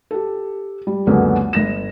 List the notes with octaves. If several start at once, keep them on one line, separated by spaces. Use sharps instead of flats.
G4 A4
G3
C#2 F#2 D3 A#3 B3
G1 A#6 E7